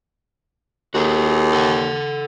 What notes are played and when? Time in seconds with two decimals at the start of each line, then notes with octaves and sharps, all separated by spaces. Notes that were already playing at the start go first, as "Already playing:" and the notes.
0.95 D#2 F#4 G#4 A4
1.53 A4 F#5